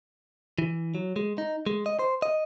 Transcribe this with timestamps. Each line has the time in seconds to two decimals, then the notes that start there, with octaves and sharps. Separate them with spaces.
0.59 E3
0.95 F#3
1.16 G#3
1.38 D#4
1.67 G#3
1.86 D#5
1.99 C5
2.22 D#5